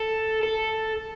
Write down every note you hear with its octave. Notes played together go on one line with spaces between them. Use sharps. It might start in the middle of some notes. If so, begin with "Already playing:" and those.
Already playing: A4
A4